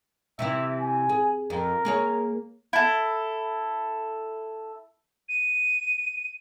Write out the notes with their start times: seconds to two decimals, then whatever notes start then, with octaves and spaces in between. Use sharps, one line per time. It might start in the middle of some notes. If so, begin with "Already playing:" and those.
0.39 C3 E3 E4 E5
0.80 G#5
1.09 G#4
1.50 F2 A#4
1.85 A#3 G#4 C#5
2.73 E4 A4
5.29 D#7